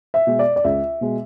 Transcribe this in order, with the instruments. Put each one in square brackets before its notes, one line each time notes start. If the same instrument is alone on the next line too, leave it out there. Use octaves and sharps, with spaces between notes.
[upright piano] E5
B2 G#3
D5
D5
C#2 E5
B2 G#3